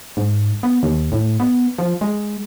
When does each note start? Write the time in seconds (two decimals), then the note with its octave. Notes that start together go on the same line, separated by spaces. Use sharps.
0.17 G#2
0.63 B3
0.83 D#2
1.12 A2
1.40 B3
1.79 F3
2.01 G#3